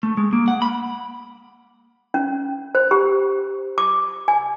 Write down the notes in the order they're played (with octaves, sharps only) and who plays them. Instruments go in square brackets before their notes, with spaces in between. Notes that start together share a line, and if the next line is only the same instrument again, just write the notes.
[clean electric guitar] A3
G#3
A#3
F#5
B5
[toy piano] C#4
C5
G4
D6
G#5